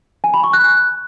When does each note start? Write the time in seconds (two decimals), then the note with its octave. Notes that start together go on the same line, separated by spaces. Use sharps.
0.24 G#5
0.34 B5
0.44 C#6
0.53 F#6